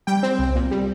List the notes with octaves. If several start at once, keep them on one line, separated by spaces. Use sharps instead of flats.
G3 G5
C4
C2
A#2
G3